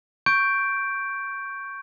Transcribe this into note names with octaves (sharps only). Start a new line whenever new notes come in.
C#6 G6 D7